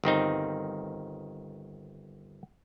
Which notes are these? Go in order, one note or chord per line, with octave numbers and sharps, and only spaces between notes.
G1 D#3 C4 D#4